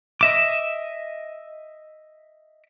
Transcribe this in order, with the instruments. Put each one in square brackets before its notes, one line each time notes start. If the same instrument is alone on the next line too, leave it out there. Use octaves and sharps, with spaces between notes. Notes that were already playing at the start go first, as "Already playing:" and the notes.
[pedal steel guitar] D#5 E5 D6